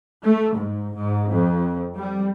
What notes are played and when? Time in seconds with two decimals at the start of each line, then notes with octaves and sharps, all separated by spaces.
0.25 A3
0.57 G#2
0.97 G#2
1.31 F2
1.97 G3